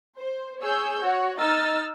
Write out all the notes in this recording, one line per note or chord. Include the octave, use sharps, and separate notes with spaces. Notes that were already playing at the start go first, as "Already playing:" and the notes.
C5
G#4 C#5 E6 G6
F#4 C#5
D#4 D#5 E6 F6 A6